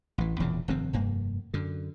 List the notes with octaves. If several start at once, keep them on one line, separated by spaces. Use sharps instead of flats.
A1 E3
E1 E2 A#2 C#3
F1 G2 D#3 C4
F1 G2 A#3
F#2 D3